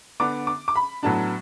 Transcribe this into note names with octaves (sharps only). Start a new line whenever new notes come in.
D3 B3 D4 D6
D6
D6
B5
A2 F#3 B3 D4 A5